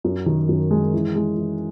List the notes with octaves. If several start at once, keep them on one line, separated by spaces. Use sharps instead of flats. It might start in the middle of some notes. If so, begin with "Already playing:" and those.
F#2
D#3
F#2
G#3
E3
G#3
E3